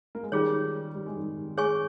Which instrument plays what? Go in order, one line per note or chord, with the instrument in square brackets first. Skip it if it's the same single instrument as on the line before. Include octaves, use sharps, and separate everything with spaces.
[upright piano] A#3
G#3
[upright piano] D#3 G3 [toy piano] C#4 F4 G#4 C#5
[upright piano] G3
G#3
D#3 G3
[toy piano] G#4 C#5 G#5 C#6